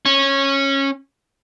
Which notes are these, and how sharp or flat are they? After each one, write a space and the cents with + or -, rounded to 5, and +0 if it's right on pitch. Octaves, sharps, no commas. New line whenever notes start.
C#4 -15